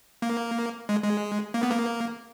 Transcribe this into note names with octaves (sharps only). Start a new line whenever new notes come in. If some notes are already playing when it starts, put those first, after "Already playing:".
A#3
G#3
G#3
A#3
B3
A#3